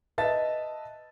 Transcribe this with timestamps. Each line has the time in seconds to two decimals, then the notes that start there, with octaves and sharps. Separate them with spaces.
0.18 B4 D#5 E5 A5 A6